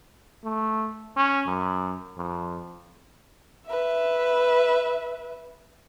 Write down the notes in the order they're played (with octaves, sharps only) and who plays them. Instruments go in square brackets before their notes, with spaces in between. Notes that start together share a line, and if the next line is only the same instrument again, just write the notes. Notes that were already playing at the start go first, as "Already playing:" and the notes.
[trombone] A3
C#4
F#2
F2
[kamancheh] B4 E5